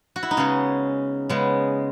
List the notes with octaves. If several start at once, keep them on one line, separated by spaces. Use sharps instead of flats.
F#4
E4
D#4
C#3 G#3 B3 C#4
C#3 G#3 B3